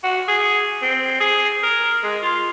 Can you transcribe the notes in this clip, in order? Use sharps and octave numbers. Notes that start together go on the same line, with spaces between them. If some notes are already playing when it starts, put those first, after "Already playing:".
F#4
G#4
C4
G#4
A#4
G#3
F4